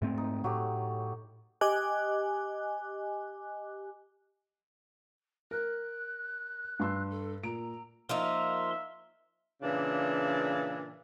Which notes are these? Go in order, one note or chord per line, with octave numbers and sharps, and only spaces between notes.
G#2 A3 C4
D#4
A2 F#3 A3 G4
G4 D#5 G#5 D6 F#6
A#4 F#6
G2 C6 E6
A4
A#2 A#5 D7
F3 A#3 D#4 E5 C6
A#2 C#3 E3 D4